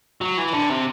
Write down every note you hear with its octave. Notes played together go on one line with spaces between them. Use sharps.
F#3
E3
D3
C3